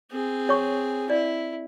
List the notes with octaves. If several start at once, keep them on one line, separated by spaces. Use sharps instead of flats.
C4 G#4
C#5 C#6
E4 D5